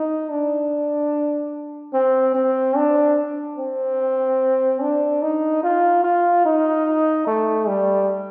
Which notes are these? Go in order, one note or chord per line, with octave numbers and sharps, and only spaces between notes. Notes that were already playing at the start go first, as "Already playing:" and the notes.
Already playing: D#4
D4
C4
C4
D4
C4
D4
D#4
F4
F4
D#4
A3
G3